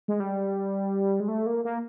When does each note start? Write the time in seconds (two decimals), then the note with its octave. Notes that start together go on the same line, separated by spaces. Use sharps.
0.08 G#3
0.20 G3
1.20 G#3
1.28 A3
1.46 A#3
1.65 A#3